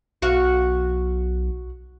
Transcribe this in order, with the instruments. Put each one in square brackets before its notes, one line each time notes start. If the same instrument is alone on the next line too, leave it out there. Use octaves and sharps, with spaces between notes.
[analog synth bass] B1 [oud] F#4 F5